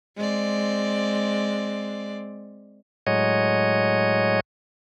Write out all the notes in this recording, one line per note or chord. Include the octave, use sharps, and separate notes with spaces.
G#3 C4 D5
A2 F#3 G#3 C#5 D#5